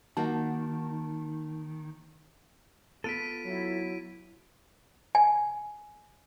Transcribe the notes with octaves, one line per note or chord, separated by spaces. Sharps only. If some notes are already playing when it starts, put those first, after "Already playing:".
D#3 A#3 D#4 F#4 A5
B3 F4 A4 B6 D7 D#7
F#3 E4
G#5